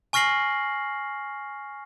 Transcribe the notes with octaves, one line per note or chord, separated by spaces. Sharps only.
G#5 C#6 F6 A#6 C7 F#7